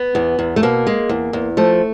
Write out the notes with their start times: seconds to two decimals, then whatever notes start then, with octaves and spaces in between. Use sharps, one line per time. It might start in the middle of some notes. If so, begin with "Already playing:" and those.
Already playing: B3
0.15 E2
0.39 E2
0.56 A3
0.63 B2 A#3
0.87 G#3
1.09 E2
1.33 E2
1.57 F3 A3